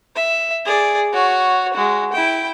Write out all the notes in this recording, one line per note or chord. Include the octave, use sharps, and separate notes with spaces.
E5
G#4 D5
F#4 C#5
G#3 F#4
E4 G5